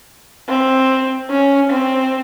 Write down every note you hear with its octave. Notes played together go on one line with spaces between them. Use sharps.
C4
C#4
C4